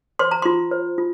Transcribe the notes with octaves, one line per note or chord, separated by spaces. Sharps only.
C5 C6
A#5
F4 C6
C5
F4